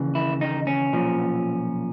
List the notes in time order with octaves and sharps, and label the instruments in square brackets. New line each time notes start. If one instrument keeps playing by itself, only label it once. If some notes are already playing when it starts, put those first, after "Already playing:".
Already playing: [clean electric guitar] D#2 C#3 E3
E4
D#4
C#4
B1 A#2 F3